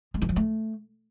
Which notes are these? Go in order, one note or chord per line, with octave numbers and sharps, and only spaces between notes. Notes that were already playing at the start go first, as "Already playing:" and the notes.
G#3
D#3
F3
A3